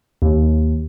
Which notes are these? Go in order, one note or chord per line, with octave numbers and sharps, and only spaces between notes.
D#2